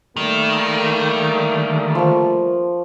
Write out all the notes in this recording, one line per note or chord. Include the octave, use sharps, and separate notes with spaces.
D#3 G3 A3 A#3
F3 C#6